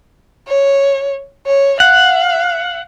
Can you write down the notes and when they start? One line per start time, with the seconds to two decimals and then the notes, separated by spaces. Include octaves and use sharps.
0.48 C#5
1.47 C#5
1.80 F5 F#5